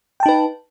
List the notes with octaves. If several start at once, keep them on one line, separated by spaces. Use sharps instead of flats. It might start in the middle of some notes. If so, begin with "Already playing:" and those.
D#4 B4 G5 A5